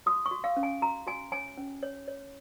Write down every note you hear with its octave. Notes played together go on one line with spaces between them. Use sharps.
F#4 D#6
C#6
F#4
F5
C#4
G#5
F#4 A#5
F#4 G#5
C#5 G#5
C#4
C#5
C#5